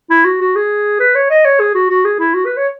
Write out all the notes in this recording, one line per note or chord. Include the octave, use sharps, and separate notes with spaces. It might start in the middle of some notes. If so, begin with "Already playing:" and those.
E4
F#4
F#4
G#4
B4
C#5
D#5
C#5
G#4
F#4
F#4
G#4
E4
F#4
B4
C#5